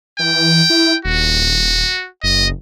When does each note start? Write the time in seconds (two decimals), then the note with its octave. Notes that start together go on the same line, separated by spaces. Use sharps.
0.20 E3 G5
0.70 E4
1.05 D#1 F#4
2.23 F#1 D#5